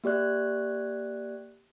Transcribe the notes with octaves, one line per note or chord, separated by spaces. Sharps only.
A#3 G4 D5 F#6